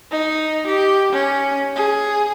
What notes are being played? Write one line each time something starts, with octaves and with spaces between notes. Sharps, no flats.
D#4
G4
C#4
G#4